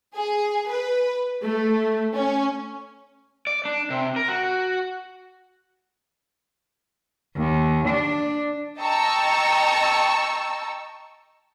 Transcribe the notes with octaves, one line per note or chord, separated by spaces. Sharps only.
G#4
B4
A3
C#4
D5
D4
C3
A#4
F#4
D#2
D4
D#5 G5 A5 A#5 C#6 E6